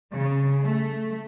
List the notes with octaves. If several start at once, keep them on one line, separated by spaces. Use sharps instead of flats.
C#3
A3